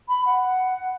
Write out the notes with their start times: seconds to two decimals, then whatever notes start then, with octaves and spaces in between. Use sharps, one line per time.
0.09 B5
0.26 F#5